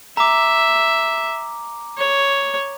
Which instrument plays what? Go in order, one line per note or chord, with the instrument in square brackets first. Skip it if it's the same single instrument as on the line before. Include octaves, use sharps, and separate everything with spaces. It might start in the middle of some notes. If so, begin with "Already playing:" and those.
[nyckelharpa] E5 [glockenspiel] A#5 D6
[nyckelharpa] C#5